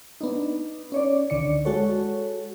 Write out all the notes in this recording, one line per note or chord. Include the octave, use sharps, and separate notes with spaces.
B3 D4 D#4
C#4 C#5 D5
C#2 D3 D#3 D5 C#7
G#3 F#4 A4 C#5